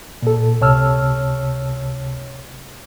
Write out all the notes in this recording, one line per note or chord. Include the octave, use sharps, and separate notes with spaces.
A#2 A4
C#2 C3 C#5 A5 E6 F6